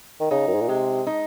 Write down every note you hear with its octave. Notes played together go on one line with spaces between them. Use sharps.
D#3
C#3 D#4
F#2
G#2
A#2
C3 G#3
D#4